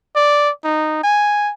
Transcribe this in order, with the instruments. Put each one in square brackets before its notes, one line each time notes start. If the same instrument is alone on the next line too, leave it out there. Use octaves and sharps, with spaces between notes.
[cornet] D5
D#4
G#5